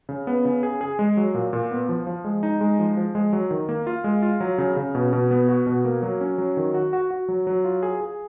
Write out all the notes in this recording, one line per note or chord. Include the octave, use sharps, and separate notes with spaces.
C#3
B3
C#3
G#4
G#4
G#3
F#3
A#2
A#2
B3
F3
F3
G#3
D#4
G#3
F3
F3
G#3
F#3
D#3
A#3
F4
G#3
F4
F#3
C#3
C#3
B2
B2
B3
F#4
B2
A#3
F#3
C#4
F#3
D#3
F#4
F#4
F#4
F#3
F#3
F4
G#4
G#4